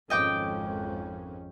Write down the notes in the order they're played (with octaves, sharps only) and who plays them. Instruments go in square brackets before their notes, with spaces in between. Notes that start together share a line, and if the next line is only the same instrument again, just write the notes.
[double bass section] G#1 F2 C#4 [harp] D#5 G5 D6